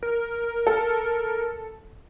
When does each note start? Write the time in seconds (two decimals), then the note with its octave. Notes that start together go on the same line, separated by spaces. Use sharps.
0.03 A#4
0.67 A4